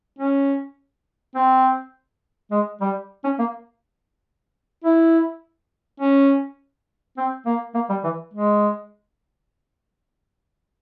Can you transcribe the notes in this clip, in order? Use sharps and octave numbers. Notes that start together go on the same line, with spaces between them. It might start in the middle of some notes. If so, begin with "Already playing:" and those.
C#4
C4
G#3
G3
C#4
A#3
E4
C#4
C4
A#3
A#3
G3
E3
G#3